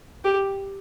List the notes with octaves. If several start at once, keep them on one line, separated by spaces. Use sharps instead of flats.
G4